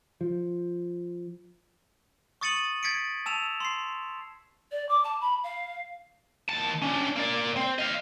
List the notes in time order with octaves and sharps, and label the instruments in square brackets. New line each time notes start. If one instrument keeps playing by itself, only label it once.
[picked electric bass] F3
[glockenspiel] C#6 D#6 A6 C#7 D#7 F#7
G#6 A6 B6 C#7 D7
A5 E6 E7 F7
C6 C7
[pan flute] D5
D6
A5
B5
F5
[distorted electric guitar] D#2 A5
C#4 D4
A#3 D5
C4
D#5 F5